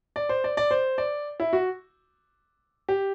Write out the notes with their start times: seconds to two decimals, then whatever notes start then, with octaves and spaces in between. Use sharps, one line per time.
0.16 D5
0.29 C5
0.44 D5
0.57 D5
0.71 C5
0.98 D5
1.40 E4
1.53 F#4
2.89 G4